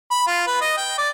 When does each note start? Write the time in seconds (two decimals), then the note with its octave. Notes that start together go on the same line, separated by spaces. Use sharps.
0.11 B5
0.27 F4
0.47 B4
0.61 D#5
0.77 G5
0.98 D5